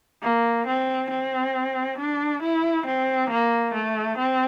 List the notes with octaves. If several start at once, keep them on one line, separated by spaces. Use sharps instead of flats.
A#3
C4
C4
D4
E4
C4
A#3
A3
C4